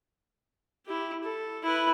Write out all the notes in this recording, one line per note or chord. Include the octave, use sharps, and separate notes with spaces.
E4 G4
A4
E4 B4